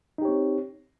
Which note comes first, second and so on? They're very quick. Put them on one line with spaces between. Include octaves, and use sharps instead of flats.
D#4 G4 C#5 C4